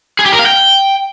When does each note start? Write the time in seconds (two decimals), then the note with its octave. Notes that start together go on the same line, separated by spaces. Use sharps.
0.19 G#4
0.26 G4
0.32 A#4
0.39 F5
0.46 G5